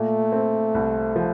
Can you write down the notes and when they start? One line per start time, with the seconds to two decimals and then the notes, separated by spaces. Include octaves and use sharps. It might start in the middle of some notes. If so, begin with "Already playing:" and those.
Already playing: A#2 A3
0.32 C4
0.74 C2
1.16 F3